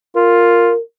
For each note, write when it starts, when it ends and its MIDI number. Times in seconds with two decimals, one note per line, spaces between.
0.16 0.72 65
0.16 0.80 70